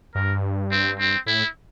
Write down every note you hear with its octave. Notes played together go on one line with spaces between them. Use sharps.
G2 A#4
C4
C4
A2 E4